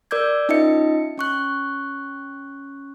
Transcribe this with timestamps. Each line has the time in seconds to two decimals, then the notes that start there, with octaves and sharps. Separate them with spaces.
0.11 A#4 D5 D6 E6 G6 G#6
0.49 C#4 D#4 F4 D#5 E5 C#7
1.18 C#4 C#6 F#6